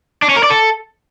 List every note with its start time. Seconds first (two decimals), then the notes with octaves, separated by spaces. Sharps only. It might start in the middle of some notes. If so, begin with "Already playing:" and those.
0.22 D4
0.29 C#4
0.36 A#4
0.43 D5
0.50 A4